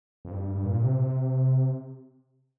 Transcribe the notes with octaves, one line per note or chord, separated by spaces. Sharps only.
F2
G2
G2
A#2
C3
C3